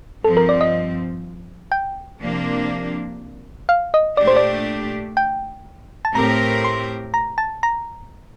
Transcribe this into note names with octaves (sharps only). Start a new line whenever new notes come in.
G2 F3 C4 A4
A#4
D5
D#5
G5
C3 F3 A#3 D4
F5
D#5
A#2 A3 D4 G4 D5
C5
D5
G5
A5
A2 A3 C4 G4 A#4 A#5
C6
A#5
A5
A#5